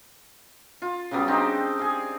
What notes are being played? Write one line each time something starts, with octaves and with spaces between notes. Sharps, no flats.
F4
C#3 F#3 G3 B3
C4 D4 D#4 G4
G#4 F5